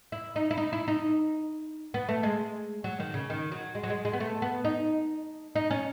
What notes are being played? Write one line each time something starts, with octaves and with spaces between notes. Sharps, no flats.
E4
D#4
E4
D#4
E4
D#4
B3
A3
G#3
F#3
D#3
C#3
D#3
F#3
G#3
F#3
G#3
G#3
B3
A3
B3
D#4
D#4
C#4